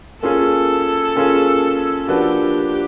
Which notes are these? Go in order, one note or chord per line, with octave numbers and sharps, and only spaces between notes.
A#3 C#4 F4 G#4 A4
A#3 C#4 F4 G#4
F3 A#3 D4 F#4 G4 B4